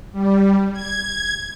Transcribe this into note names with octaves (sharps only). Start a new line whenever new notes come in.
G3
G#6